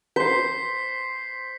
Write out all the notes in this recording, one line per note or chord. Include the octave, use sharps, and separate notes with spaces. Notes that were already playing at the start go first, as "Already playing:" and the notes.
C5 B6 C7